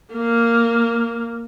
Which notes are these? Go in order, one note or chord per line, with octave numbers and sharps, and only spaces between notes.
A#3